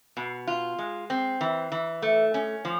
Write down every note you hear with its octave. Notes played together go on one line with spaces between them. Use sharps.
B2
F4
G#3
C4
E3
E3
A3
C#4
F3